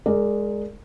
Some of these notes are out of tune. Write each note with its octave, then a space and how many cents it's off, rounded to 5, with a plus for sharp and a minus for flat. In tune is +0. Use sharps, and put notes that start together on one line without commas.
G#3 +0 A#4 -25 D5 +0